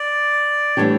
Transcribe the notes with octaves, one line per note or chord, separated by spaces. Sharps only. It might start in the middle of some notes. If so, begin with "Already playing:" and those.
Already playing: D5
A2 E3 G3 D4 G4 C#5